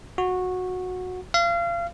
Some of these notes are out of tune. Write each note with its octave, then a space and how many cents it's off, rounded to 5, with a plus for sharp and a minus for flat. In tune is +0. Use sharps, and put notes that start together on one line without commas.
F#4 -15
F5 -30